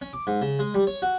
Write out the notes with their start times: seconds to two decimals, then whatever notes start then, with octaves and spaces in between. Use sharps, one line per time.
0.02 C#4
0.13 D6
0.27 G#2
0.42 C#3
0.59 G#3
0.74 G3
0.87 C#5
1.02 F#4